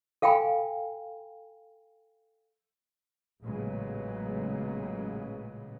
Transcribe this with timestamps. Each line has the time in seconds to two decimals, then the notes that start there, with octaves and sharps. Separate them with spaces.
0.22 A4 F5 G5 G#5 B5
3.43 A1 A#2 C#3 F#3 G#3 B3